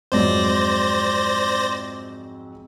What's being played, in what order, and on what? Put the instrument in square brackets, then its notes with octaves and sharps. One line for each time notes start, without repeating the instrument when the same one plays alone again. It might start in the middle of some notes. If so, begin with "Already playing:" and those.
[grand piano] F2 G#2 F#3 [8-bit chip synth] C5 D5 A#6